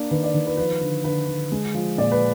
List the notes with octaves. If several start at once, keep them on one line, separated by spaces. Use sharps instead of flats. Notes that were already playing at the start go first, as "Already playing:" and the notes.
Already playing: A#3 D4 D5
D#3 B4
D5
D#3
B4
F3 B4
D3
D3 B4
D3
G#3
F3
A#2 D5
B4